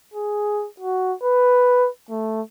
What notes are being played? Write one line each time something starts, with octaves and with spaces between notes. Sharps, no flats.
G#4
F#4
B4
A3